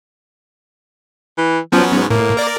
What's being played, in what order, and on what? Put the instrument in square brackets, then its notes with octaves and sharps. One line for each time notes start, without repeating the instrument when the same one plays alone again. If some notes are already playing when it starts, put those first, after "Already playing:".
[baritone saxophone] E3
[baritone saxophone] F3 [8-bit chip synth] F#3 B3 C#4
[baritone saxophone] G#2
[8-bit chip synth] A2 [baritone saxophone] A#3
[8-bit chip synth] A#4 D5